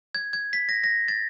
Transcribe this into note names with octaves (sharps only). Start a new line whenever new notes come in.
G#6
G#6
B6
A#6
A#6
A6